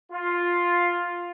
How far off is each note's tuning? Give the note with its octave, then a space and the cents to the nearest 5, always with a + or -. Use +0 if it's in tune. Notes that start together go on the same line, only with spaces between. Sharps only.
F4 +5